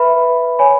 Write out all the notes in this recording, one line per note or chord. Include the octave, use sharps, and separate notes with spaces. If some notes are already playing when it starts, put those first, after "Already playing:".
Already playing: B4 E5 B5
C#5 G#5 B5